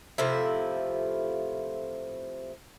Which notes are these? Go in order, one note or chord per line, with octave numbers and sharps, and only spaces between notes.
A2 C3 F3 E4